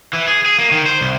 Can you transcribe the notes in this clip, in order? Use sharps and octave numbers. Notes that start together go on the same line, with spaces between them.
E3
G#4
G#4
A#3
D#3
C5
C2